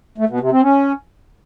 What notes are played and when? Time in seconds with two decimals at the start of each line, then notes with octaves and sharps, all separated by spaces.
0.18 A3
0.29 B2
0.40 C3
0.52 C4
0.63 C#4